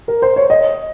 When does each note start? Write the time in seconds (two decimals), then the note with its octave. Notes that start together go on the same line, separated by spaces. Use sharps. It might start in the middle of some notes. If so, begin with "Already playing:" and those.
0.08 A#4
0.22 C5
0.36 C#5
0.50 D#5